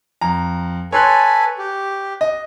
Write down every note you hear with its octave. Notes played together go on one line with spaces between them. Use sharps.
F2 A#5
A4 B4 C#5 G#5 C6 F#6
G4
D#5